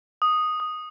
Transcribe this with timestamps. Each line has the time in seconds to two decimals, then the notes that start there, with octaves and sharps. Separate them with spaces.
0.22 D#6
0.60 D#6